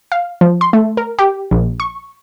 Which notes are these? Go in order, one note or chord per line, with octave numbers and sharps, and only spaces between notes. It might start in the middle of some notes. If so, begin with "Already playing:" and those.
F5
F3
C6
A3
A#4
G4
A#1
C#6